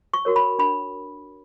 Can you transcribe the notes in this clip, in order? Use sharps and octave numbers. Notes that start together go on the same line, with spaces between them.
C#6
F#4 A#4 C#5
B5
D4 B5